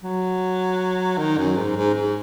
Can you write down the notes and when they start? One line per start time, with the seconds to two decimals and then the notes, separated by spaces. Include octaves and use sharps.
0.04 F#3
1.18 D#3
1.38 F#2
1.57 G#2
1.76 G#2
1.94 G#2